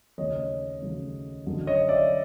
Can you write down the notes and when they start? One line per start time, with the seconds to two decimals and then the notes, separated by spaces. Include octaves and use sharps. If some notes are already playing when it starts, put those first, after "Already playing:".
0.18 D#2 C#3 F#3 A3 C#5 D#5
0.82 D#2 C#3 F#3 A3
1.47 F#2 D3 F#3
1.67 C#5 D#5
1.88 D5 E5